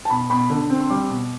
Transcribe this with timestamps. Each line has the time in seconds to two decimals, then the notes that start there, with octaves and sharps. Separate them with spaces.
0.05 A5
0.10 B2 B5
0.30 B2 B5
0.50 D3
0.70 C4
0.81 C6
0.90 G3 D6
1.10 B2